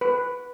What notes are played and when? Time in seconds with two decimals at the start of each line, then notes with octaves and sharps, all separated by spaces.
0.01 B4